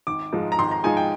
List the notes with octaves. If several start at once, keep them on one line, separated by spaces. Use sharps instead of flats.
G#1 D6
G#2 F3 G#3 D#4
A#5
G#1 C6
A#5
G#2 F3 G#3 D#4 G#5
G5